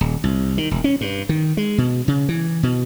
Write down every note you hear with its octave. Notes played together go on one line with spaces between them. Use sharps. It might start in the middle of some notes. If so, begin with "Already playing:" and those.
D#1
C2
D#3
E1
C#4
G2
D#3
G#3
B2
C#3
E3
B2